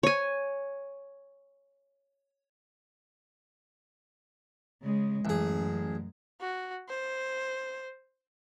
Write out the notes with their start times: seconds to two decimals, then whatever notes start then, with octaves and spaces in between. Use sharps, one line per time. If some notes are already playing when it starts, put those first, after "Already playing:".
0.03 C#5 G#5
4.83 C#3 G#3
5.25 A1 F#2 G#4
6.41 F#4
6.89 C5